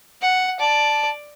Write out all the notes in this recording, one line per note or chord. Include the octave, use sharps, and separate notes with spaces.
F#5
D5 A5